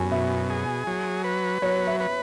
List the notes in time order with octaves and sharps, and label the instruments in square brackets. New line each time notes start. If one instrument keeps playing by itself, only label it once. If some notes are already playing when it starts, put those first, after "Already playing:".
Already playing: [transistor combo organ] F#2 [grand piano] G#5 B5
[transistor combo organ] B2 [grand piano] E5
[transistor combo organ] G#4
F#3
B4
[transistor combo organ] F#3 [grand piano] C#5
[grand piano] E5
[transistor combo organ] B4